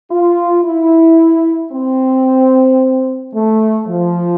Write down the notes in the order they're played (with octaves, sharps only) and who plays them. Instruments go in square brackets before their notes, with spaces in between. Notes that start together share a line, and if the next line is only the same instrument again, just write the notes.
[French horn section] F4
E4
C4
A3
F3